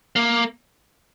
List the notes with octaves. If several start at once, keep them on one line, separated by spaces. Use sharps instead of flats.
A#3